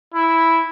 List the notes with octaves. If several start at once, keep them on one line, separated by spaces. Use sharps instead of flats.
E4